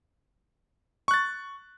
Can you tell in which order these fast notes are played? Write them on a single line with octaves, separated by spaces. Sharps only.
C#6 F#6 A6